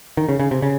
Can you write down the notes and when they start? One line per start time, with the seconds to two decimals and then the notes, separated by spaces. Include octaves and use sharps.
0.17 D#3
0.29 C#3
0.40 C#3
0.51 C3
0.62 C#3